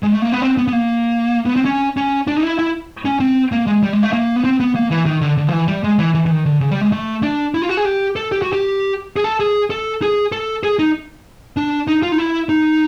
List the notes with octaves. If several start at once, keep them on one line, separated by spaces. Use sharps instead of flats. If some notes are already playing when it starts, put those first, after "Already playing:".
G#3
A3
A#3
B3
C4
B3
B3
A#3
B3
C4
C#4
C#4
D4
D#4
E4
E4
C#4
C4
A#3
G#3
G3
G#3
A3
A#3
B3
C4
B3
A#3
E3
D#3
D3
D3
F3
E3
G3
G#3
E3
E3
E3
D#3
D3
C#3
G3
G#3
A3
D4
E4
F4
F#4
G#4
G4
A4
G4
F#4
G4
G#4
A4
G#4
A4
G#4
A4
G#4
D#4
D4
D#4
F4
D#4
E4
D#4